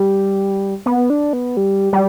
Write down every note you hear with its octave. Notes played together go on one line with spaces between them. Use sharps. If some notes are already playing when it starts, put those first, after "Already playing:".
Already playing: G3
B3
D4
B3
G3
G3